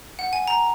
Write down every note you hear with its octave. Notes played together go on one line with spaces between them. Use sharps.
F#5
G#5
A#5